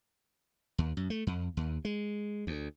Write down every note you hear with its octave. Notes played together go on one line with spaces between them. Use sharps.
D#2
F#2
A3
F2
D#2
G#3
D2